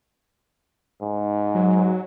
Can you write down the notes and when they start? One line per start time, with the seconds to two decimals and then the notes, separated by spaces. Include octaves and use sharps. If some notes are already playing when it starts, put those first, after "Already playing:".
1.01 G#2
1.55 F#3